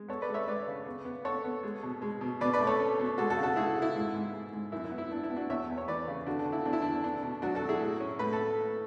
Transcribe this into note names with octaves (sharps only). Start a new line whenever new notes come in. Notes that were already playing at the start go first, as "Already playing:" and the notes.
Already playing: G#3
B3 A4 C#5
B4 D5
G#3
C#5 E5
G#3 B4 D5
C#3
B3
B3
B3 A4 C#5
B3
G#3
B2
G#3
B2
B2 B4 D5
B4 D5
A3
A4 C#5
C#4
B2
G#3 F#4 A4
F#4 A4
C#3
F#4 A4
G#3 E4 G#4
C#3
E4
G#2
G#2
G#2
G#2
F#2 E4
E4
B3
E4
B3 D4
E4
B3
D4 F#4
E2 C#5 E5
E2
C#5
E3 B4 D5
C#3
D3 D4 F#4
D4
D3
E4
E2 D4
E4
D3 D4
B3 D4
B2
F#3 D4 F#4
F#4 A4
F#3
E4 G#4
A2
C#4
A2 B4
A4